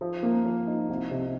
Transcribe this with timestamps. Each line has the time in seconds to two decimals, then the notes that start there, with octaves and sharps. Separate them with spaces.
0.01 F3
0.23 A#3
0.45 F3
0.67 D#4
0.89 C2
1.11 C3